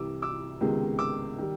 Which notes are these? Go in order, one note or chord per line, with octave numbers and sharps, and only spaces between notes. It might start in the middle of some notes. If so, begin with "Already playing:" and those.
Already playing: C2 C3 E3 D6 E6
D6 E6
C#2 C3 D#3 G#3 B3
D6 E6
D#3 G3